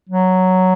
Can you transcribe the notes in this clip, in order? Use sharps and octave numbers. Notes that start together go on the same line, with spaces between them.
F#3